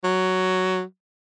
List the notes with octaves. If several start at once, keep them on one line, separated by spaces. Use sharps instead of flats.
F#3